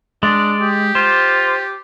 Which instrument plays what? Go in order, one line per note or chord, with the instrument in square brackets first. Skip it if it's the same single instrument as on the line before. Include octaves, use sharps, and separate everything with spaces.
[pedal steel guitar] G#3 [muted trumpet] D4 [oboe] D5
[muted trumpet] G4
[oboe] F4 [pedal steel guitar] C5